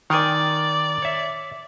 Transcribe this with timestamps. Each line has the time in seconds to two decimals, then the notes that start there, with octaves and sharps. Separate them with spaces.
0.10 D#3 D5 G5 G#5
1.02 C#5 E5